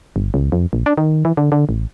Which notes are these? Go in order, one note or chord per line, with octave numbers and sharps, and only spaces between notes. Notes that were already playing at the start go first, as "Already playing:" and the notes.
G1
C#2
F2
A#1
D4
D#3
E3
D3
D3
A1